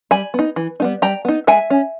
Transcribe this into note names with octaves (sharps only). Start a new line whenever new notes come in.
G3 G#5 B5
B3 D#4
E3
G3 B3 D#4
G3 G5 A#5
B3 D#4
G#3 E5 G#5
C#4